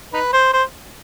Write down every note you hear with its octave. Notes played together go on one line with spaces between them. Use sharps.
D#4 B4
C5
C5